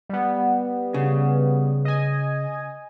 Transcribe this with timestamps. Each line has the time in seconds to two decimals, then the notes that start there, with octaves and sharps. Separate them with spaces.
0.09 G3 B3
0.94 C#3
1.85 D#5 G#5